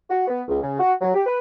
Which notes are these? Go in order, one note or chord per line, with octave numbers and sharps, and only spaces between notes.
F#4
B3
C#2
C#3
F#4
F#3
G4
B4